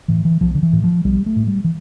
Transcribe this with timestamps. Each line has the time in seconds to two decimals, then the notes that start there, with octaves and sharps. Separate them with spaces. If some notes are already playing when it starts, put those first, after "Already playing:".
0.08 A2 E3
0.25 E3
0.41 B1 F3
0.55 D3
0.63 E3
0.73 A2
0.84 F3
1.05 B1 G3
1.26 A3
1.36 A2
1.47 G3
1.64 E3